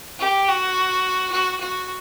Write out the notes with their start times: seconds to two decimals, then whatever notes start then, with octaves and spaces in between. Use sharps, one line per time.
0.20 G4
0.48 F#4
1.32 F#4
1.60 F#4